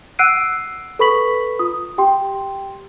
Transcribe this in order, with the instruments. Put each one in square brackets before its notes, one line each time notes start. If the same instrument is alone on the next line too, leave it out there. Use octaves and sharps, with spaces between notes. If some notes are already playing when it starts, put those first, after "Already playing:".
[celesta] F#5 E6 F#6 C7 D7 D#7
A4 B4 B5 C#6 B6 F#7
F4 D#6
G4 G5 C6